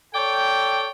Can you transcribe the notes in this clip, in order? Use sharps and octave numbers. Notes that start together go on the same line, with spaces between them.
A4 C#5 D5 G5